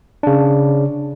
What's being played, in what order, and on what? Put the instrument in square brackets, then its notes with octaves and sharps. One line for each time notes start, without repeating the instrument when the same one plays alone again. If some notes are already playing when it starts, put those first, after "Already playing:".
[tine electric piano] C#3 D4